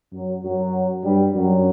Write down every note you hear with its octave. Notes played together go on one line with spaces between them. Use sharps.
F#2 F#3
F#2 F#3
G2 G3
F#2 F#3